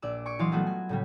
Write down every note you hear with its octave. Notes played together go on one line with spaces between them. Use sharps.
A#1 D5 E6
G#5 C#6 D6
E3 F#3 D#5 F5 C6
F#3 G3 A3 B3 F4 F#4
G#5
A2 C#3 G3